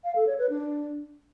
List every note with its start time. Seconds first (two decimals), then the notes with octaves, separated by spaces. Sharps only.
0.04 F5
0.16 A4
0.27 C#5
0.38 B4
0.50 D4